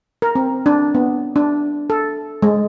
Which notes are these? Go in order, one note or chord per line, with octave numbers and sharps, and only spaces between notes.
A#4
C4
D4
B3
D4
A4
G#3